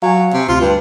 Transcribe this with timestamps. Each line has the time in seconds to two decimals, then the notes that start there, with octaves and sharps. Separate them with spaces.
0.03 F#3 F5 G#5
0.33 C3
0.49 D2 F4
0.61 G2